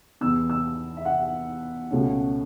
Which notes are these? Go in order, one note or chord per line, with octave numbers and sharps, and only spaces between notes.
E2 E3 B3 E6
E6
E5
F#5
C#2 B2 A3 C#4